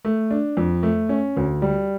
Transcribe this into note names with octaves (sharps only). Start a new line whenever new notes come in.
A3
D4
F2
A3
C#4
D2
G3